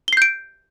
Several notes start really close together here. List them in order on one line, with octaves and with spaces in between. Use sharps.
G7 C7 G6 D7